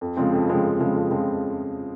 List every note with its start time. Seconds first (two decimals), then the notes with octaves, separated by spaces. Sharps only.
0.01 F2
0.17 C#3 F3 G#3 C4
0.33 F2
0.48 C#3 F3 G#3 C4
0.64 F2
0.79 C#3 F3 G#3 C4
0.95 F2
1.11 C#3 F3 G#3 C4